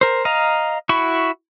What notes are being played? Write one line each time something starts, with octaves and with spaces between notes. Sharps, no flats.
A#4 C5
D#5 F5 A#5
E4 F#4 B5 C#6